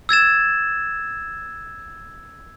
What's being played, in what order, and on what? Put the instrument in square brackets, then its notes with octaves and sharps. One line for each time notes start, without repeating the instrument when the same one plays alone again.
[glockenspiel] E6 G#6 A6 E7